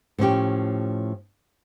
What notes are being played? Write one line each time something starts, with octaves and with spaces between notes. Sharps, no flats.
A2 F3 C#4 G4